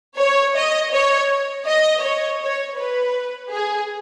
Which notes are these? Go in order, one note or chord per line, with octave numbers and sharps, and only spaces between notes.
C#5
D#5
C#5
D#5
C#5
C#5
B4
G#4